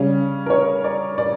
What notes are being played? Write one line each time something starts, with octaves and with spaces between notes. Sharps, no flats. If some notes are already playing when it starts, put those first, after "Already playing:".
Already playing: C#3 G3 C#4
A#4
C#5
D5
D5